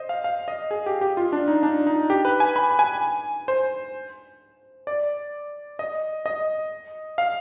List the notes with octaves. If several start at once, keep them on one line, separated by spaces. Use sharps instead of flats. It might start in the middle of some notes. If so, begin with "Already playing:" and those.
Already playing: C5 D#5
F5
F5
D#5
G#4
G4
G4
F4
D4
D#4
D4
D#4
G4
B4
G#5
B5
G#5
C5
D5
D#5
D#5
F5